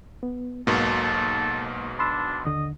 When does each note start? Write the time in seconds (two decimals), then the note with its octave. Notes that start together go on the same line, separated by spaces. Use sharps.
0.23 B3
0.67 B1 G#2 B2 A#3 A4
1.02 A4
1.99 D4 B5 C6 E6
2.45 D#2 D3 D#5